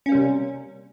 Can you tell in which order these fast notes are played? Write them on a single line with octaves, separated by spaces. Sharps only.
C#4 A#3 G3 C3